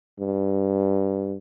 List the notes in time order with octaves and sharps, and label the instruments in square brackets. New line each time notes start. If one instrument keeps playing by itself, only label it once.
[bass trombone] G2